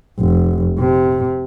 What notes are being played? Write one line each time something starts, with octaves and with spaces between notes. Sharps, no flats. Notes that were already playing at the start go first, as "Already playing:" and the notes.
F1
C3